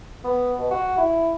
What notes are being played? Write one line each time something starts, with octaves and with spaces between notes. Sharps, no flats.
B3
B2
F#4
E4